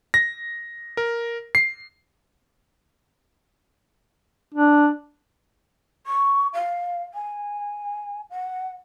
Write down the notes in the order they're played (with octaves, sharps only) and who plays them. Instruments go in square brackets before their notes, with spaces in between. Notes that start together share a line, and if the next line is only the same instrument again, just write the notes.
[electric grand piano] A#6
A#4
C7
[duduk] D4
[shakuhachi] C#6
F5
G#5
F#5